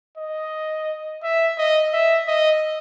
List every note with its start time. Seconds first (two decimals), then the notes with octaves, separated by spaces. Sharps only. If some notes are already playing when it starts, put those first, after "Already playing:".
0.18 D#5
1.23 E5
1.58 D#5
1.93 E5
2.28 D#5